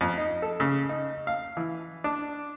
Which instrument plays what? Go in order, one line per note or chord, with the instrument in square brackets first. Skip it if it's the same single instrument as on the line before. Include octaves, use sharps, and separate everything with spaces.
[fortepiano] F2
D#4
A4
C#3
D#4
F5
E3
D4